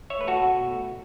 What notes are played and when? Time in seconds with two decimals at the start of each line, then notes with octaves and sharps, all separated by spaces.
0.10 C#5 E5
0.19 A3 B4
0.27 F#4 A4
0.45 B2
0.71 A3